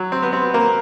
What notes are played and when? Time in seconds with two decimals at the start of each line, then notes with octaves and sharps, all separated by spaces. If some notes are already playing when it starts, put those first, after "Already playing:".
Already playing: F#3
0.12 C4
0.23 B3
0.33 C4
0.54 A#3